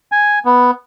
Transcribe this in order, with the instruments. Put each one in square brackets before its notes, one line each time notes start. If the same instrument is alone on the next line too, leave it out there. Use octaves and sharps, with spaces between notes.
[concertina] G#5
B3